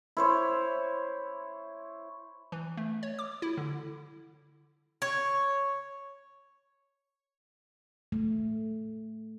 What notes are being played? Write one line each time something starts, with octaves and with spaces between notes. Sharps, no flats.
E4 C5 C#5
E3
A3
C#5
D6
E4
D3
C#5
A3